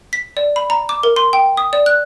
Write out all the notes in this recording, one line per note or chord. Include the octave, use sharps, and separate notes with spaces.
B6
D5
B5
A#5
D6
A#4
C6
G5
D#6
D5
F#6